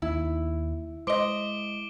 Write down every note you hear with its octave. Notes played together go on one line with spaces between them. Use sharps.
D#2 E4
G#3 C5 D#5 D6 D7 G7